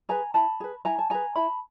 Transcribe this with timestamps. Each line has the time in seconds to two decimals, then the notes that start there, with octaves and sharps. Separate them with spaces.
0.09 G#4 B4 G#5 A#5
0.34 E4 A5 B5
0.60 G#4 B4
0.85 E4 G#5 A#5
0.99 A5
1.10 G#4 B4 G#5 A#5
1.36 E4 A5 B5